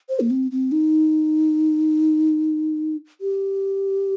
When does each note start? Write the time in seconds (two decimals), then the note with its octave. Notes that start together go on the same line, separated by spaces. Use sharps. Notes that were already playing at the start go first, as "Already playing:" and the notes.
0.09 C5
0.20 A#3
0.30 C4
0.51 C4
0.72 D#4
3.21 G4